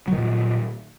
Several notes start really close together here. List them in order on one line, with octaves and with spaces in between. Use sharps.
F#3 D#3 A#2